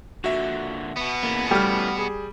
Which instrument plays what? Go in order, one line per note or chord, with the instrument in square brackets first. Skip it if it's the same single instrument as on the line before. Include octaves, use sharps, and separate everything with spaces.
[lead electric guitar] A#2 D3 [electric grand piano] F#4 E5 F#5
[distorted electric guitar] B2 B3
[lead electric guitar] C#3 E3 [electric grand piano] A#3
[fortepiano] G3 [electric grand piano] A3 F6
[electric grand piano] G#4